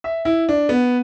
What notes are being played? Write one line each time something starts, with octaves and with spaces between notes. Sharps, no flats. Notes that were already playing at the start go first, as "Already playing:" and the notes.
E5
E4
D4
B3